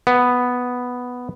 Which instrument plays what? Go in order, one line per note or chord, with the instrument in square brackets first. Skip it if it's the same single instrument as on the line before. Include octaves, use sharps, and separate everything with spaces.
[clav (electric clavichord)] B3